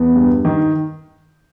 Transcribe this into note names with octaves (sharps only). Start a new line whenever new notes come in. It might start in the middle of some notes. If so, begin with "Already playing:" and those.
Already playing: E2 B3
G2
D#3